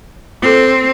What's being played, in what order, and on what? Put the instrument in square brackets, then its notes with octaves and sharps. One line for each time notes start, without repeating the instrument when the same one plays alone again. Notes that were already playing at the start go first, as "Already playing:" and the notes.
[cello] C4 [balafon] F4 A4